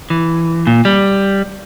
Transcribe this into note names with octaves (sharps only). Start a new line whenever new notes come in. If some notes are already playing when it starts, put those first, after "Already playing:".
E3
A#2
G3